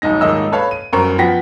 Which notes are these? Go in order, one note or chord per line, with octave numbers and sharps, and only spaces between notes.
D#1 B1 G#2 D#4 A#6
D#1 G#2 D#3 D#5 E6
A4 B4 C#5 F5 A5 B5
D#7
G1 F#2 A#4 C5 A#5 C#6
F3 B3 F#5 G5 A#6 B6